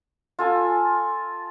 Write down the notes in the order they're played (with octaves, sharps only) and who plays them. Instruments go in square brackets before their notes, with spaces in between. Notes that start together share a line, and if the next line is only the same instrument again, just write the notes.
[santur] F4 A4 G#5